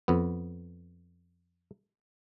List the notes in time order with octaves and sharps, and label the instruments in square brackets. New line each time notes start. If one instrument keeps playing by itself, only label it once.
[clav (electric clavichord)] F2 B3